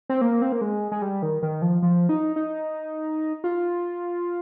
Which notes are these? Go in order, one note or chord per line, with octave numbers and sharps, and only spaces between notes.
C4
A#3
C4
A#3
G#3
G#3
G3
D#3
D#3
F3
F3
D#4
D#4
F4